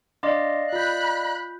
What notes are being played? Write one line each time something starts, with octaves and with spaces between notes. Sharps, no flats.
D4 D5 D#5 F5 C6 D6
F4 B5 F#6 G6